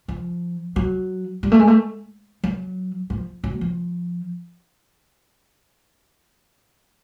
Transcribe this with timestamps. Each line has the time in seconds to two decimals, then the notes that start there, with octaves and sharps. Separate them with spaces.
0.08 F3
0.76 F#3
1.43 G3
1.52 A3
1.60 G#3
1.67 A3
2.43 F#3
3.10 F3
3.44 F#3
3.61 F3